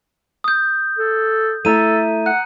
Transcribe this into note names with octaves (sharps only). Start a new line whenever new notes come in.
D#6 G6
A4
A3 E4 A4 E5 A#5 D#7
F#5 F#6